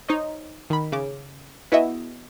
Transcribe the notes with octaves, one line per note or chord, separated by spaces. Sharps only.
D#4 C5 C#5 D#5
D#3 B5
C#3 D6
B3 E4 F#4 G#4 D#5 E5